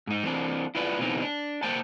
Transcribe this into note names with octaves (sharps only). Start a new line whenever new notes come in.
G#2 D#4
E3 C4 D4
E4 F4 B4 D5
B2 E3 C4 D#4
D4
A#3 C5 G5 A5